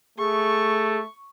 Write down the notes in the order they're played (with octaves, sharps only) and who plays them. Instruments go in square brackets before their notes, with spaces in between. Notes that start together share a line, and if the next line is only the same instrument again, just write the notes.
[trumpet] A3 [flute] G#4 [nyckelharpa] C#6